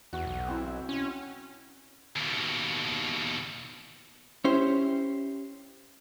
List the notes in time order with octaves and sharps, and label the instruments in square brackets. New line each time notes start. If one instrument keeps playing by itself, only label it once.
[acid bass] E2 [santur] F#4
[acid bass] B1
[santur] C4 E4
[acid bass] C#4
[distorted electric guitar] D#2 B2
[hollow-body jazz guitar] C#4 E4 G4 C5